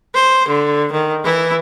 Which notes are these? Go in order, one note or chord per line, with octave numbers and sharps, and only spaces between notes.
C5
D3
D#3
E3 E4